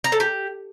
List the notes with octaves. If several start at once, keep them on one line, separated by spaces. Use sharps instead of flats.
A#5
A4
G4